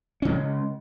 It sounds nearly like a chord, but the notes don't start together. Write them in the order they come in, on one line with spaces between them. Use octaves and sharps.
C#4 C#3 G#3